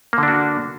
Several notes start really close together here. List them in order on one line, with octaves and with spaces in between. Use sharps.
A#3 D3 D4 F#4